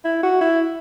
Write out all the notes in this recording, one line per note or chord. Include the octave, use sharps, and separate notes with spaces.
E4
F#4
E4